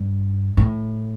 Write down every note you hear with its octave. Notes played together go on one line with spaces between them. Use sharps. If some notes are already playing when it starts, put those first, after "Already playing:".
Already playing: G2
A2